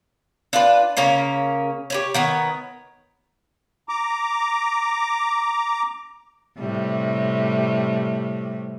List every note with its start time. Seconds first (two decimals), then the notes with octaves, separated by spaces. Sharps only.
0.53 D4 F4 B4
0.97 C#3 A#3 C#4 A#4
1.90 G4 B4 C#5
2.14 D#3 B3 C#5
3.89 A#5 D6
6.59 A2 C3 G3